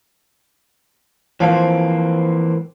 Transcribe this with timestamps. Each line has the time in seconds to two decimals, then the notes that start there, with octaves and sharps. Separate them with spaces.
1.40 E3 F3 A#3 C4